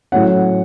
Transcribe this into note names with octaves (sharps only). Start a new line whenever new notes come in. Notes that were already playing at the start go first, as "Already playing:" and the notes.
A2 F#3 C#4 F#5